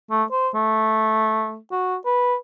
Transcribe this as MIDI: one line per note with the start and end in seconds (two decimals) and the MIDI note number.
0.11 0.24 57
0.32 0.49 72
0.55 1.58 57
1.71 1.96 66
2.06 2.35 71